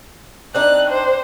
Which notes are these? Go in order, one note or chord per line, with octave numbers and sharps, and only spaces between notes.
C4 D4 D#4 F#6
C5